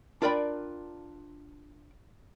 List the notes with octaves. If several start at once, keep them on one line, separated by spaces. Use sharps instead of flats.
D4 F4 A#4 D5 G5 B5